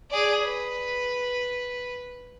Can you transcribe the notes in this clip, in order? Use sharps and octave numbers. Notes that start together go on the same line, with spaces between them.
G#4 D5
B4